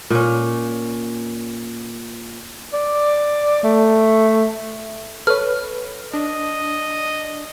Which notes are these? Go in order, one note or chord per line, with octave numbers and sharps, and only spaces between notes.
A#2 C#4
D5
A3
A4 B4 C#5 F6
D4 D#5